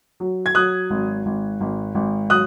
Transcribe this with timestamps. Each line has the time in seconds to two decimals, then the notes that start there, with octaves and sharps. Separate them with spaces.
0.20 F#3
0.46 G#6
0.55 F#3 D#6 F#6
0.90 G#1
1.26 G#1
1.61 G#1
1.95 G#1
2.30 F#3 D#6 F#6